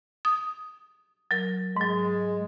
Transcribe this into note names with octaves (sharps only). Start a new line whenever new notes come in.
D#6
F#3 A#4
G#2 F#3 G#3